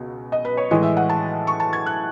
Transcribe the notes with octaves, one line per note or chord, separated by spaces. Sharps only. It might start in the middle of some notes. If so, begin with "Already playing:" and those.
Already playing: C#2 B2
D#5
B4
C#5
A2 E3 G#3 D#5
E5
F#5
A5
C#6
A5
G#6
F#6